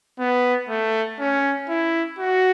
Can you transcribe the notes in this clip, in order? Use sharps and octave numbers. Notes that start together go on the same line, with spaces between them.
B3
A3
C#4
E4
F#4